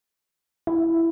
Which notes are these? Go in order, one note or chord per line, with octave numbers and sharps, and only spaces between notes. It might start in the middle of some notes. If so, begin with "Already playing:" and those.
E4